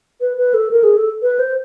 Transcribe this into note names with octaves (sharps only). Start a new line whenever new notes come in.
B4
B4
A4
A#4
G#4
A4
B4
C5